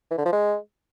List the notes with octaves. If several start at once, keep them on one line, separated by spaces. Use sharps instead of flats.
E3
D3
F3
G#3